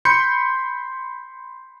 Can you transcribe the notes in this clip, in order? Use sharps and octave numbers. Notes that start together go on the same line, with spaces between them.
B5 C6 G6 C#7